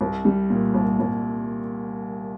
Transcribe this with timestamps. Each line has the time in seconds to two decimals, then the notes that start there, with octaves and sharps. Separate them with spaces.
0.01 C2
0.25 G3
0.50 A#2
0.74 C2
1.00 C2